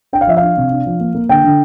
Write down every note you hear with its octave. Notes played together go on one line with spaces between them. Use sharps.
D4 G5
F5
F3 E5
F5
D4
C3
D4
F3
A#3
A#3
D3 G5
D3